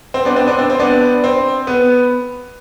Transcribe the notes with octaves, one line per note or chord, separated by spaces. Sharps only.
C4
B3 D4
C4
B3 D4
C4
C4
B3 D4
C4
B3